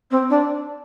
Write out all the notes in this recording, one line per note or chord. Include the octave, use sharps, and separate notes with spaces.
C4
D4